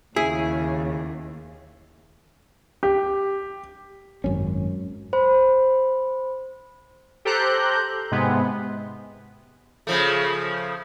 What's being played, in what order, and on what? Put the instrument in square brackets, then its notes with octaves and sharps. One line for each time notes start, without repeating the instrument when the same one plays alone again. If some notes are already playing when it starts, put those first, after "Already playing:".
[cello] D#2 [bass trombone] C#3 [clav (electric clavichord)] E4 [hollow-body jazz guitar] G#4
[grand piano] G4
[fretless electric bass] G#1 F#2 C#4
[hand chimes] C5 B5
[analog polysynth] G4 A4 C5 A#5 F#6 G6
G#2 C3 G#3 B3
[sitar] C#3 F3 A3